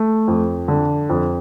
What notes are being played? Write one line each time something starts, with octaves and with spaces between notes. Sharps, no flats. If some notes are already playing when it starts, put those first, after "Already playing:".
Already playing: A3
F2
D3
F2